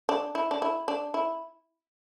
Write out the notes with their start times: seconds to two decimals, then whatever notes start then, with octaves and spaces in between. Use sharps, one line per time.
0.09 D4
0.35 E4
0.51 D4
0.62 E4
0.88 D4
1.14 E4